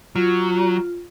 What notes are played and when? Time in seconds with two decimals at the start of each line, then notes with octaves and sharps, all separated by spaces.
0.16 F#3 F4